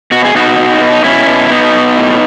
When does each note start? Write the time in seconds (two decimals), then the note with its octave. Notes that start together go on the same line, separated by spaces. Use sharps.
0.11 B2 F#4
0.25 G#4
0.35 B2 D#4 F#4
0.58 B2
0.81 B2
0.92 D#4
1.04 B2 C#4 E4
1.27 B2
1.50 B2 B3 D#4
1.73 B2
1.97 A2